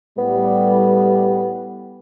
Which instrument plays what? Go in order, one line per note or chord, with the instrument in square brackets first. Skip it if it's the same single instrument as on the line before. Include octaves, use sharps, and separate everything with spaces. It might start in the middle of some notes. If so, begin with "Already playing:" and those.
[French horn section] A2 G3 [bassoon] B3